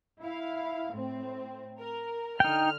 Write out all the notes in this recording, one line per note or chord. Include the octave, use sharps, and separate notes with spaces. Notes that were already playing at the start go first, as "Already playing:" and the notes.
E4 F5
A2 C4
A#4
D3 D#4 G5 F6